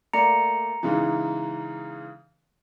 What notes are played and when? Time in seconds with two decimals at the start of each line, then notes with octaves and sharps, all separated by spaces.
0.13 A3 A#3 D5 A#5 C#7
0.83 G#2 C#3 E3